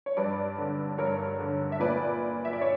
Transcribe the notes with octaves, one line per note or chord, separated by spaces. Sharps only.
C#5
G2 B4 D5
D3
G2 A#4 C#5
D3
E5
A#2 B4 D5
E5
D5
C#5